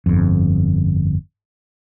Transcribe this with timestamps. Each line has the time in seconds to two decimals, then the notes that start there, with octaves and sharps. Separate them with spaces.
0.06 G1 F2